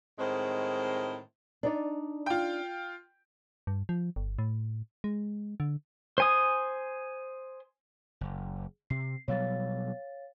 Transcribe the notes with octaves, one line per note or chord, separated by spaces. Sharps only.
A2 D#3 G#3 C4 C5
D4 D#4 D5
F4 G5
G2
F3
G1
A2
G#3
D3
C5 G#5 D#6
F#1
C3 C7
B2 F#3 G3 C#5 F5 A6